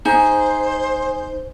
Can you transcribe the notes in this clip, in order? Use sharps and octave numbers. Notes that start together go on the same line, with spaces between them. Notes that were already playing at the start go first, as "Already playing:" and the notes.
D#4 G#4 C5